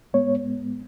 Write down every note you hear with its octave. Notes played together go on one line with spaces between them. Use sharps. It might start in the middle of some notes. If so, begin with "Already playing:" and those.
A2 G#3 B3 C#5